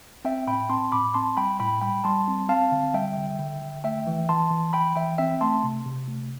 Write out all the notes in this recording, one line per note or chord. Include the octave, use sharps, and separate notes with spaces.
C4 E5 G5
A2 G5 B5
C4 A5 C6
A2 B5 D6
C4 A5 C6
G3 G5 B5
A2 G5 B5
G3 G5 B5
G3 A5 C6
C4
C4 F5 A5
D3
G3 E5 G5
D3
D3
D3
A3 E5 G5
E3
E3 A5 C6
E3
E3 G5 B5
E3 E5 G5
C4 E5 G5
A3 A5 C6
C3
C3
A3